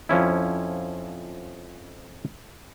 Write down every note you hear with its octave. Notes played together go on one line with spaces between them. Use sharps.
F2 F3 C#4 E4